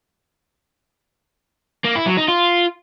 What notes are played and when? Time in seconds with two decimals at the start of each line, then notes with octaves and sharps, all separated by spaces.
1.84 A#3
1.95 E4
2.06 F#3
2.17 D#4
2.28 F4